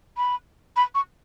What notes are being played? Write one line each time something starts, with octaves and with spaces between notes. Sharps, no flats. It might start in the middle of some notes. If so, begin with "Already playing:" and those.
B5
B5
C#6